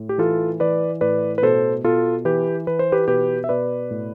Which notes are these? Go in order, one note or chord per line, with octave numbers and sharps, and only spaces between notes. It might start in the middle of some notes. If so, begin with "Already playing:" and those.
Already playing: A2
G4
E3 F4 A4
E3 B4 D5
A2 B4 D5
B4
B2 A4 C5
B2 F4 A4
E3 G4 B4
E3 B4
C5
G4 B4
B2 G4 B4
E5
B2 B4 D5
A2